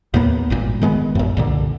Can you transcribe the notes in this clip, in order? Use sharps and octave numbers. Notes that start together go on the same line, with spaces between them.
D#2 A2 A#3 B3
G#1 G2 A#2
D#3 G#3 A#3 B3
A1 F#2
C2 A#2 D3